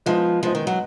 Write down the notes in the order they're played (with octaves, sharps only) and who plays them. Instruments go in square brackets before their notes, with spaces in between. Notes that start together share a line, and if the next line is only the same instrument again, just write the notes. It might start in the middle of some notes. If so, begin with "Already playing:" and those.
[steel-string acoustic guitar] F3 [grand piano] G#3 B3 D#4
[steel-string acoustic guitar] F3 [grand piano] G#3 B3 D#4
[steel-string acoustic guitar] D#3
F#3